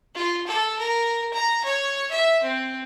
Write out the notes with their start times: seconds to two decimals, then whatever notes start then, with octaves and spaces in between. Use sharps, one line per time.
0.15 F4
0.47 A4
0.79 A#4
1.33 A#5
1.64 C#5
2.11 E5
2.43 C4